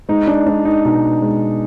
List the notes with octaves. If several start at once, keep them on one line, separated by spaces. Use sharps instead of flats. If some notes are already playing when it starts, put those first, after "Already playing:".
G#3 D#4
D4
G#3 D4
D#4
B2 D#4
G#3